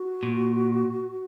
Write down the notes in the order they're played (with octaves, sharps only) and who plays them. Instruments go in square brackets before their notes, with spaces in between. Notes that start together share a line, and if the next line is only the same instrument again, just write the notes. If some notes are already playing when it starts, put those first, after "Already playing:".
Already playing: [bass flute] F#4
[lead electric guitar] A#2